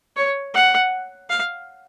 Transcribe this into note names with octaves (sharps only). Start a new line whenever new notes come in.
C#5
F#5
F5